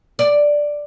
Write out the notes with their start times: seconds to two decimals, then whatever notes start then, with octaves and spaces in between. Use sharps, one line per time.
0.19 D5